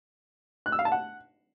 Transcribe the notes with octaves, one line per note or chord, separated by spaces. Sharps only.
F#6
E6
F5
A5
F#5